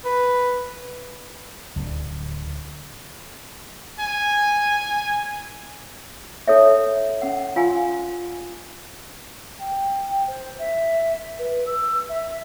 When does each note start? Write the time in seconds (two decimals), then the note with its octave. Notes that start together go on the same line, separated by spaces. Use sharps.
0.05 B4
1.76 D1 D2
4.00 G#5
6.47 D#4 A4 C#5 E5
7.22 C#4 F#5
7.56 F4 F5 G#5 C6
9.58 G5
10.27 C5
10.58 E5
11.38 B4
11.66 E6
12.09 E5